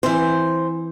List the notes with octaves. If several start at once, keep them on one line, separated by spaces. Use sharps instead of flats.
E3 C4 C5